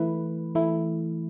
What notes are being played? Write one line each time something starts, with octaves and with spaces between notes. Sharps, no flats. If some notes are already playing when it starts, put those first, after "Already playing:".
Already playing: E3 A3 E4 B4
E3 A3 E4